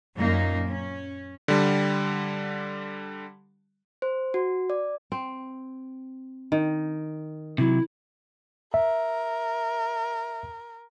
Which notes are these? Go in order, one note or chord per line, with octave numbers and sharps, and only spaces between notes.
F#2 A#2 A#3 D#4
C#4
D3 G3
C5
F#4
D5
C4
D#3
C3 F#3 E4
A#4 E5